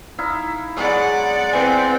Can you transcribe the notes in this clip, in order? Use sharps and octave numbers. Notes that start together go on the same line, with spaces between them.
D#4 E4 F5
F#3 G#3 B3 D5 F#5
E3 C4 B4 G#5